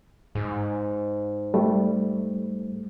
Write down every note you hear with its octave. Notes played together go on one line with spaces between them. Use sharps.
G#2
G3 A3